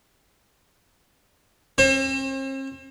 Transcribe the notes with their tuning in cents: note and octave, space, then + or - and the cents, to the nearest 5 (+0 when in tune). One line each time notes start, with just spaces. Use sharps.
C4 +45 C5 +40